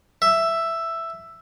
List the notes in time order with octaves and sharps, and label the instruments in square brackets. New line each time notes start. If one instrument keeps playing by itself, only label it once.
[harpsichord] E5